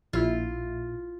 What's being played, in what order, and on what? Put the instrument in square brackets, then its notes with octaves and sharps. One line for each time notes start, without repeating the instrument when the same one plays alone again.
[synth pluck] A#1 E4 [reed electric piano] A#2 [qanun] F4